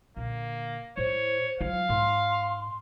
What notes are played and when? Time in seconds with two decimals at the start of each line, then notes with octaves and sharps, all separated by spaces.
0.17 A#2 D3 A#3
0.97 A2 E4 C5 C#5
1.61 F#3 F4 F5
1.89 G#2 C6